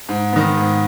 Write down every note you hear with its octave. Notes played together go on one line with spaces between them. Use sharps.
G#2
D#3 B3
G#2